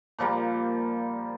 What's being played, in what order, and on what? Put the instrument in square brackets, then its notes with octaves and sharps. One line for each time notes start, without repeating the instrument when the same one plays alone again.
[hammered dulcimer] A#2 F3 G3 A#3